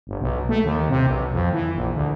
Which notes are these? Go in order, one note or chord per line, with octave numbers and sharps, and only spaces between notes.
G1
B1
A3
D#2
C3
B1
F2
E3
A#1
D2